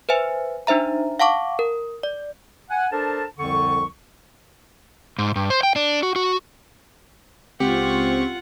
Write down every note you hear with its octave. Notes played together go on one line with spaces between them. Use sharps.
B4 C5 E5 G#5
D4 D#4 C5 E5 A#5
F5 F#5 A5 C#6 D6
A#4
D5
F#5 G#5
D4 A4 A#4 C5 A5
C2 F2 D3 F3 C#6
G#2
G2
C5
G5
D4
F#4
F#4
C#2 C4 F4 G4 F#5 C#6